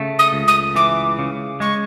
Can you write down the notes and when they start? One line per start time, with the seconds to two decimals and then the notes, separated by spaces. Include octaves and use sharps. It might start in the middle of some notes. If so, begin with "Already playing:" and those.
Already playing: C#3 A3
0.19 D#6
0.33 C#2
0.47 D#6
0.76 E3 D6
1.19 C#3
1.60 G#3 C#6